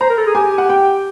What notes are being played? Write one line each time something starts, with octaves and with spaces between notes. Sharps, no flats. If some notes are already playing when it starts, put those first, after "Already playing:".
C5 A#5
A#4
A4
G#4
G4 G#5
F#5
G5